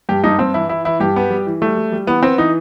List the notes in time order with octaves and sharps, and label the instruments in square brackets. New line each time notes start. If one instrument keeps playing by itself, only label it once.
[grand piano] G2 [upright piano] G4
[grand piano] G2 [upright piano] D#4
[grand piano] G2 [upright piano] C4
[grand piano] E3 [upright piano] E4
[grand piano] E3 [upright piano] E4
[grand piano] E3 [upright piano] E4
[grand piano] G2 [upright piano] G4
[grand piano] B3
G3
E3
[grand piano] G3 [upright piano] A3
[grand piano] G3
G3
[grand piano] E3 [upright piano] B3
[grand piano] B3 [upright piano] C4
[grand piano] E3 [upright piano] D#4